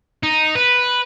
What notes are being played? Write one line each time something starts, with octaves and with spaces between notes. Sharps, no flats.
D#4
B4